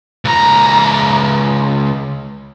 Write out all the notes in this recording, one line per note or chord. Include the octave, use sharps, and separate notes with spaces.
C#2 A#5